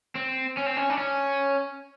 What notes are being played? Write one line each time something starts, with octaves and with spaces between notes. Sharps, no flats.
C4
C#4
C4
C#4
D4
C#4